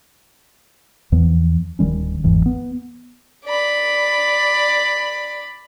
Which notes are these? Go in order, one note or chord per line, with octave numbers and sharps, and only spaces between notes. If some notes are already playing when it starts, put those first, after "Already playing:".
E2 E3 F3 B3
D1 D#3 G3 C#4
G1 E2 G#2 E3
B3
D5 B5